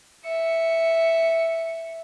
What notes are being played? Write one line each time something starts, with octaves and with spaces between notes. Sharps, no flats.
E5 C#7